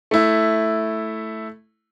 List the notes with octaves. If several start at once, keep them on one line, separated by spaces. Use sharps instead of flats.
A3 E4